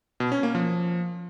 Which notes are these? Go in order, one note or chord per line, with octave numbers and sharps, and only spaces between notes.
B2
C#4
A#3
F3